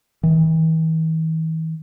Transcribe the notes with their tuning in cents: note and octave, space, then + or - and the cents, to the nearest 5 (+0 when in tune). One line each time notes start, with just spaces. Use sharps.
E3 -45